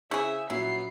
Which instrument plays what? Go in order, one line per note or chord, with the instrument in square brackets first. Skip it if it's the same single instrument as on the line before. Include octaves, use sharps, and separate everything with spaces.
[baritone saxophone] C#3 [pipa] E4 G#4 [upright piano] C5 C#6 G6 [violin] E5
[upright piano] A#1 C#4 [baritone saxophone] F#3 [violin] B3 C7 [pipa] E4